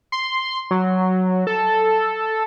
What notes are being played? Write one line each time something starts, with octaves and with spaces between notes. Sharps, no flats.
C6
F#3
A4